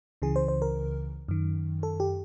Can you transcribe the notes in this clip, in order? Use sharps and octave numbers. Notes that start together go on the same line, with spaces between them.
C#2 C#3 E3 G#4
C5
C5
A#4
F#2 D#3
A4
G4